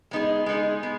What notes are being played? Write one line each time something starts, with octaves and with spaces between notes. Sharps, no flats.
G#3 B3 D#4 G#4
G#3 B3 D#4 G#4
G#3 B3